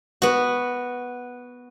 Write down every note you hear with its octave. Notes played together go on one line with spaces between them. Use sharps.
B3 F#4